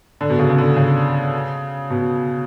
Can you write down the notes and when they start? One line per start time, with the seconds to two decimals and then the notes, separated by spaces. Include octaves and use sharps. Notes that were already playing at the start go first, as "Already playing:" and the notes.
0.21 D3
0.30 B2
0.39 C#3
0.49 C#3
0.58 D3
0.77 C#3
1.90 B2